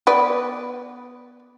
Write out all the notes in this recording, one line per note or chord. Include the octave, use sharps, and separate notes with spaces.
B3 B4 D5